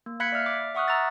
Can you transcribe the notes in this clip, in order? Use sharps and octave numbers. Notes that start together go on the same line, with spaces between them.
A#3
F5 B5 F#6 G#6 B6 C#7
D5 E5 F6
D6
E5 F#5 C#6 D#6 F6 F#6
A#5 E6 F#6 A6